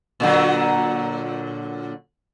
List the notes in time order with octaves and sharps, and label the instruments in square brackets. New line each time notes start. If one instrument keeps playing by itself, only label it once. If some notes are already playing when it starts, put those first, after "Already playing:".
[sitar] A#2 D3 F#3